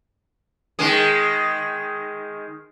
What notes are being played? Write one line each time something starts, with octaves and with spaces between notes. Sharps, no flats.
D#3 G#3 G#4